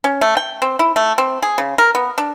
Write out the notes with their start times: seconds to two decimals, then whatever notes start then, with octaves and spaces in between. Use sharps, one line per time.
0.04 C#4
0.21 A3
0.37 G5
0.62 C4
0.79 E4
0.96 A3
1.18 C4
1.42 G#4
1.58 C#3
1.78 A#4
1.95 B3
2.18 D4